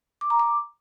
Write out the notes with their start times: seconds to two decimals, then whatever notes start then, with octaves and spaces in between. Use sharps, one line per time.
0.21 D6
0.30 A#5
0.40 D6